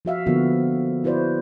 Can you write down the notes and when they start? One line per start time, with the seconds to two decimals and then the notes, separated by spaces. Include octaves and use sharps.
0.05 F3 F#4 E5 F5
0.26 D3 F3 A#3 B3 F#4
1.04 E4 F#4 B4 C5 D5